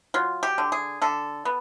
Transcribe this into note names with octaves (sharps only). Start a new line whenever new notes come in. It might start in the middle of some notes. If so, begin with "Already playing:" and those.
F#3 F4
G4
D3
G#4
D3 A4
B3